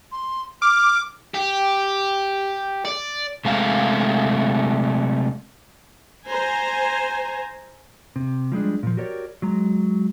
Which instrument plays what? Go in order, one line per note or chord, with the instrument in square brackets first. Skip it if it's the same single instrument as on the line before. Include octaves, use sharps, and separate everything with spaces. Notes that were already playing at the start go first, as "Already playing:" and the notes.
[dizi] C6
[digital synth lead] D6 [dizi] F6
[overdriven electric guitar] G4
D5
[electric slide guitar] C3 G#3 A3 F5
[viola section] C5 G#5 A#5
[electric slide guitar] C3
F3 G3 G#3 D4
A#2 F3
F#4 G4 A#4 C#5 D5
F#3 G#3 A#5